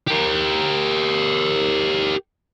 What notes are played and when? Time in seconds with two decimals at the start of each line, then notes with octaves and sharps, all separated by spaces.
0.07 G4 A#4